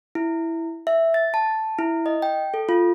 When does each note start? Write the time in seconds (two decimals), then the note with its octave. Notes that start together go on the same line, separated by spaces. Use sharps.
0.15 E4
0.87 E5
1.14 A6
1.34 A5
1.79 E4
2.06 D#5
2.22 G5
2.54 A4
2.69 F4